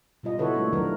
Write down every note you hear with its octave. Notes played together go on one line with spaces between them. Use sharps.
B2 G3 F4 D#5
D3 E4 F#4 A4 B4 C#5
G3 A3 A#3 F4 C#5
D#3 F3 F#3 D4 A#4 B4